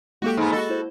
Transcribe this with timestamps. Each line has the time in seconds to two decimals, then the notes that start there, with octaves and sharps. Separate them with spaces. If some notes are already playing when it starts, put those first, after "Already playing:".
0.22 G#3 A#3 F#4 G4 A4
0.37 G#2 B3
0.52 F#4 A4 D#5
0.69 E4 C5